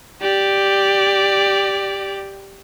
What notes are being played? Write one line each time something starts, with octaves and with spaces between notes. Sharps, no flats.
G4 D5